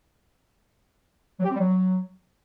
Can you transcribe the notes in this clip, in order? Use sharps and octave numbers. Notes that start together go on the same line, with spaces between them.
F#3
G4
C4
G3
F#3